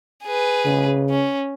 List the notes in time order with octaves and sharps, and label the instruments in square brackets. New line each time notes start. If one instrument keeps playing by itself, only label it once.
[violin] G#4 B4
[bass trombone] C#3
[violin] C#4